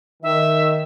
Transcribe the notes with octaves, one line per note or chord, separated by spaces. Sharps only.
D#3 E5